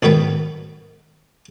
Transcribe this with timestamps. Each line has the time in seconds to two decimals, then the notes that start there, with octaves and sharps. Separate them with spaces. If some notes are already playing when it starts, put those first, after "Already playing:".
0.03 B1 G#2 D#3 B3 G5